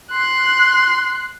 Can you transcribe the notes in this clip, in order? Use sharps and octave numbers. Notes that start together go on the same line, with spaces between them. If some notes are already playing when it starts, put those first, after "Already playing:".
C6 F#6